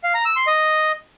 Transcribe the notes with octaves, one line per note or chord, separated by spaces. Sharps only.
F5
A#5
E6
C6
D#5